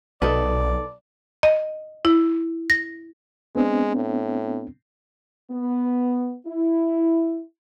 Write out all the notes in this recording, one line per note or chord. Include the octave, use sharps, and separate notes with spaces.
B1 D#4 A4 B4 D5
D#5
E4
A#6
G#3 B3 C4 D4
A2
B3
E4